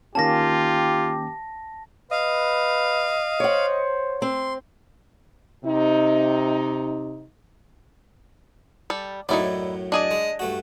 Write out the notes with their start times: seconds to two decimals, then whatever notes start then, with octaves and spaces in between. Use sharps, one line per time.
0.15 D#3 A#3 C#4 F4 G4 A5 A#6
2.11 B4 D#5 F5
3.40 C5 C#5 F#5
4.22 C4 C6
5.64 C3 D#4
8.90 G3 A4
9.29 F#2 A2 F#3 D#4 E4 D5
9.92 D4 G#4 D5 D#5
10.11 G#3
10.39 G2 A3 F#4